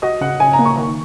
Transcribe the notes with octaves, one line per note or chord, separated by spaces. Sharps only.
F#4 D#5
C#3 F#5
C#3 G#5
A#5
A#3
C#6
D#3